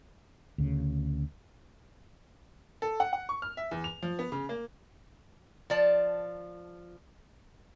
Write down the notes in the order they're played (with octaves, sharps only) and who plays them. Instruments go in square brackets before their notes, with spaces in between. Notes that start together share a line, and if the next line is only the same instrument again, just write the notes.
[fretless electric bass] D2 C#3
[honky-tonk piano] A4
F#5
F#5
C#6
F6
E5
E2
F7
F3
B3
C#3
A#3
[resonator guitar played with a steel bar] F3 D5 A5